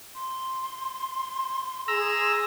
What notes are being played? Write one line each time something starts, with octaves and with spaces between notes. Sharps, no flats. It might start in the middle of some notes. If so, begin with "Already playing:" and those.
C6
G#4 A#5 E6